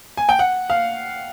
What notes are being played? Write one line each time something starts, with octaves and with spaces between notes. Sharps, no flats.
G#5
G5
F#5
F5